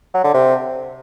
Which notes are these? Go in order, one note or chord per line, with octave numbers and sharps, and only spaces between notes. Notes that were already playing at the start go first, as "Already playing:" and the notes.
F#3
D3
C3